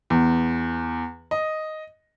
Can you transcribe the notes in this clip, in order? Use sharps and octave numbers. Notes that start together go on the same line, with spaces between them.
E2
D#5